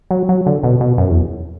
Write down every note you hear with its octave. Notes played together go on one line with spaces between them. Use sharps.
F#3
F#3
D3
B2
B2
F#2
E2